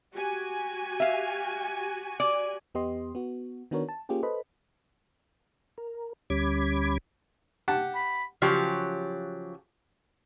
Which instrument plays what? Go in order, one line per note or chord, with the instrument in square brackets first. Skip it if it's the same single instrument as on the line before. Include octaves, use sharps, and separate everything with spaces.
[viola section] F#4 G4 G#5
[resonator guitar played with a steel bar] E5 F5
D5
[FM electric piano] E2 B3 G4 D#5 C6
B3 F#4
D#3 B3 D4 F#4 A#4 C#5
A5
A#3 C#4 F4 G4 G#4
A4 B4 C5 D#5 B5
[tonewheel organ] A#4
D2 G3 C#4 B5 D6 G#6
[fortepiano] G4 F#5 A5
[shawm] B5
[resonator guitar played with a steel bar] C#3 F3 F#3 G4